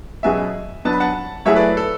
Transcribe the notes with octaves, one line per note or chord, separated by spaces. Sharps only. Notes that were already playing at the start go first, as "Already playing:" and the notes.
B2 F#3 C#4 G#4 E5 G#5
F#3 B3 D4 A5
B5
F#5 A5
F#3 A3 E4 G#4 C#5 E5
B4 D5
A4